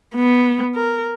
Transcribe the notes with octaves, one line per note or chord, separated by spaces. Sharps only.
B3
A#4